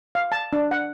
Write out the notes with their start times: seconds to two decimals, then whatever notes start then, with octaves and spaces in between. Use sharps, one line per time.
0.15 F5
0.32 A5
0.53 D4
0.71 F#5